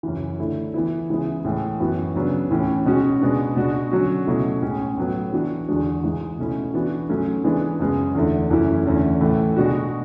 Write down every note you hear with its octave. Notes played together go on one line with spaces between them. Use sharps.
F#2 C#3 E3
D3 A3 E4
E3 B3 E4
C#3 E3 G#3 B3 E4
A2 E3 G#3
F#2 E3 B3 F#4
C#3 F#3 B3 D4
A2 E3 A3 C#4
B2 G#3 C#4 F#4
B2 G#3 B3 D4
B2 G#3 D4 F#4
D3 F#3 C#4 F#4
B2 F#3 A3 C#4 E4
A2 G#3 C#4
A2 F#3 B3
E3 B3 D4 F#4
E2 D3 G#3 D4 F#4
G#2 E3 G#3
B2 A3 C#4 E4
E3 B3 D4 F#4
G#2 F#3 A3 C#4
E3 G#3 B3 D4
F#2 C#3 G#3 B3
E2 D3 A3 E4
F#2 E3 A3 C#4 E4
E2 D3 A3 C#4 E4
A2 E3 A3
B2 G#3 D4 F#4